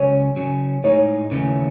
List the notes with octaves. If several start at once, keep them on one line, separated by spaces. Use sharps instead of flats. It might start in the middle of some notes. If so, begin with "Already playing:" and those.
Already playing: C#2 C#3 F#3 C#4 C#5
C#3 F#3 C#4
A2 G#3 D#4 C#5
D#2 C#3 E3 A3 C#4